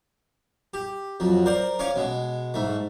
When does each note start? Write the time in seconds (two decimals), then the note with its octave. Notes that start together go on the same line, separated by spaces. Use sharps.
0.74 G4
1.20 F2 F#3
1.46 A#4 C5 D5
1.79 C#4 C#5 F5 D6
1.96 B2 G#3
2.54 G#2 A3